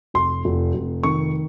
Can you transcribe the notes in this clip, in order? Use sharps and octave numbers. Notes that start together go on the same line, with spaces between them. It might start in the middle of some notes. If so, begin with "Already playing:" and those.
F1 C6
F1
F1
D#3 C#6